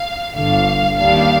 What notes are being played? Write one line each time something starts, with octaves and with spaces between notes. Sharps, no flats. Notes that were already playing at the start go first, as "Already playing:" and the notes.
Already playing: F5
G1 G2 D3 F5
D#2 D#3 G3 D4 F5